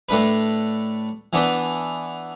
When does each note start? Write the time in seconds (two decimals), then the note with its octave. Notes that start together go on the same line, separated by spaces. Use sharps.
0.09 A2 A3 D4 B4
1.33 E3 B3 D4 B4